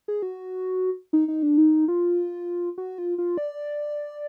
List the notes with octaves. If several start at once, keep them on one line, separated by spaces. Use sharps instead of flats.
G#4
F#4
D#4
D#4
D4
D#4
F4
F#4
F4
F4
D5